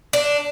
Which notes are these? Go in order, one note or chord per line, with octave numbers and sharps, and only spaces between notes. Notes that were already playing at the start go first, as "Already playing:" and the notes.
D4